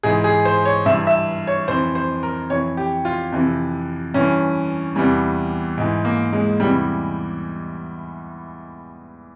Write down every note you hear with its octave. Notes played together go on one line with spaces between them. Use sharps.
G#2 E3 G#4
G#4
C5
C#5
G2 E3 E5
E5
C#5
F2 E3 C5
C5
A#4
F2 E3 C#5
G4
F4
F2 C3 E3
G2 E3 C#4
E2 C3 E3 G3
G#2 E3
A#3
G#3
E2 C3 E3 G3